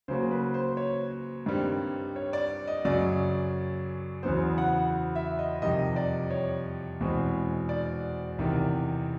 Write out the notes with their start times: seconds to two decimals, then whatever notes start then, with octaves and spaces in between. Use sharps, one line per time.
0.08 C#3 F#3 A#3 C5
0.31 B4
0.54 C5
0.77 C#5
1.46 G2 D#3 G3 C4
2.16 C#5
2.33 D5
2.68 D#5
2.85 F#2 C#3 F#3 D5
4.23 E2 C#3 F#3 B3 C5
4.58 F#5
5.16 E5
5.39 D#5
5.62 F2 C3 D#3 G3 D#5
5.96 D5
6.31 C#5
7.00 E2 B2 G#3 C4
7.69 D5
8.38 E2 C3 D#3